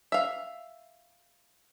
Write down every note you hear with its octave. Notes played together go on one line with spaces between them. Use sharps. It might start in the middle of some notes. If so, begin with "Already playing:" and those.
E5 F5